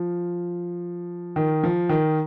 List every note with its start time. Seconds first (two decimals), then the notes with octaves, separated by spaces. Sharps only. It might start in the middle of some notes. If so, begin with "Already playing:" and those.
Already playing: F3
1.36 D#3
1.64 F3
1.89 D#3